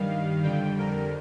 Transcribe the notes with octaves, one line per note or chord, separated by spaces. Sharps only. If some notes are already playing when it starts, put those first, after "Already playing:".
Already playing: G2 D#3 G3 F5
F2 D3 G3 G5
A#4